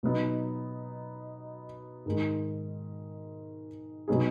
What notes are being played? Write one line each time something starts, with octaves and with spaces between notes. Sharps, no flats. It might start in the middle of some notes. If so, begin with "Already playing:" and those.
B2 F#3 B3 D#4
G#2 D#3 G#3
B2 F#3 B3 D#4 G#4